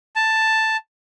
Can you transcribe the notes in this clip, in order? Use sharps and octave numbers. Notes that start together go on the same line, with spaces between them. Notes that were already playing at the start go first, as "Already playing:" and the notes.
A5